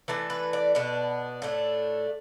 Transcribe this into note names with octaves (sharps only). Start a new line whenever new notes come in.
E3 A3 D4 A5
B4
D5
B2 B3 D4
A2 A3 D4